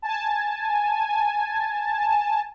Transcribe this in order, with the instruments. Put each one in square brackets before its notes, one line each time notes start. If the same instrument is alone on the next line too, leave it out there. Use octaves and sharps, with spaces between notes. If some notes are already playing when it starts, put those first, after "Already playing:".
[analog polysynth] G#5 A5